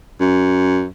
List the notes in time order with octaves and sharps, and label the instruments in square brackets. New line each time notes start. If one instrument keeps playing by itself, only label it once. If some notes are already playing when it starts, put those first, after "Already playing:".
[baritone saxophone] F#2